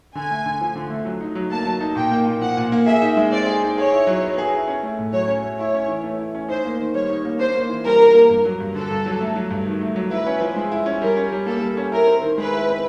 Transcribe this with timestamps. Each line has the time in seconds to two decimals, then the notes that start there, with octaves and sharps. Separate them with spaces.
0.15 D3 G#5
0.31 A3
0.46 D3
0.61 F3
0.76 D3
0.90 A3
1.05 F#3
1.21 D#4
1.35 F#3
1.51 A#3 A5
1.66 F#3
1.81 D#4
1.96 A#2 G5
2.12 A#3
2.26 A#2
2.42 F3 F#5
2.57 A#2
2.72 A#3
2.86 G#4 E5
3.02 D#4
3.17 G#3
3.32 C4 D5
3.47 G#4
3.62 D#4
3.78 G#4 C#5
3.92 E4
4.07 F#3
4.23 B3
4.38 G#4
4.53 E4
4.67 C#4
4.83 A3
4.99 A2
5.13 F#3 C#5
5.28 C#4
5.43 A3
5.59 E4 C#5
5.74 C#4
5.88 E3
6.04 A3
6.18 E4
6.34 C#4
6.48 D#4 C5
6.65 A#3
6.79 D#3
6.94 G3 C#5
7.09 D#4
7.25 A#3
7.39 D4 C5
7.55 A#3
7.69 E3
7.84 G3 A#4
8.00 D4
8.14 A#3
8.30 G2
8.45 F#3
8.60 G2
8.75 D3 A4
8.91 G2
9.06 F#3
9.21 A3
9.36 F#3
9.51 G2
9.66 D#3
9.81 A3
9.96 F#3
10.11 E4 B4
10.27 C#4
10.41 F3
10.56 G#3
10.72 E4
10.86 C#4
11.02 G3 A#4
11.17 C#4
11.32 G3
11.46 A#3 A4
11.61 G3
11.77 C#4
11.92 E4 A#4
12.07 C4
12.22 D#3
12.38 G#3 B4
12.53 E4
12.68 C4